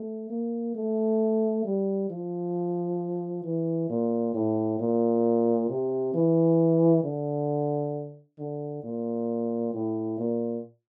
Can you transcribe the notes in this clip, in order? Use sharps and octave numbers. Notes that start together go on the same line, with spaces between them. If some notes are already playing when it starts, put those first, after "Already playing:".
Already playing: A3
A#3
A3
G3
F3
E3
A#2
A2
A#2
C3
E3
D3
D3
A#2
A2
A#2